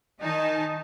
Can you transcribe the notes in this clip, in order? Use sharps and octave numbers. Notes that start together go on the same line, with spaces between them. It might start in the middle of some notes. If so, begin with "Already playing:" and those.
D#3 D#4 G#5 A5